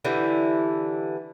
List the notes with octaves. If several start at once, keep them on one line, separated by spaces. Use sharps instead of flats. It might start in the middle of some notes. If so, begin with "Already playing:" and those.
D3 E3 G3 E4